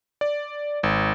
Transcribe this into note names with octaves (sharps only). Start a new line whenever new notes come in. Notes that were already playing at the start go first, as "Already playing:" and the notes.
D5
G#1